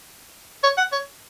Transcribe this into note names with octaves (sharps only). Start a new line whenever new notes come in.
C#5
F#5
C#5